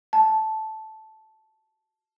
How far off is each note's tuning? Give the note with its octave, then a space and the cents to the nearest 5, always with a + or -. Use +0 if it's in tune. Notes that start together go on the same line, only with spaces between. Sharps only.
A5 -10